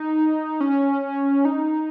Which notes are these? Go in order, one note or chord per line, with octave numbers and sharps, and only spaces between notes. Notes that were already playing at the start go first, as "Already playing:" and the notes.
Already playing: D#4
C#4
D#4